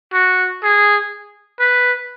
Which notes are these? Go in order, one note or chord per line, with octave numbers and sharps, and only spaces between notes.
F#4
G#4
B4